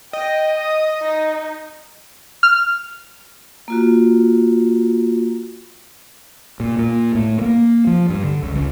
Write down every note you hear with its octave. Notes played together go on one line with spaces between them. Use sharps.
D#5 G5
D#6
D#4
F6
A#3 F4 F#4
A#2
A#2
A2
A#3
F3
G2
D3
C#2
C#2